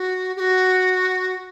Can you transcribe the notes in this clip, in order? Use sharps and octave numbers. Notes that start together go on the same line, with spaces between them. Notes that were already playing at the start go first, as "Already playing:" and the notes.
Already playing: F#4
G4
F#4